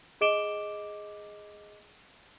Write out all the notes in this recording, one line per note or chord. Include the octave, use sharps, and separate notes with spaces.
G#4 D#5 D6 D7 E7 G7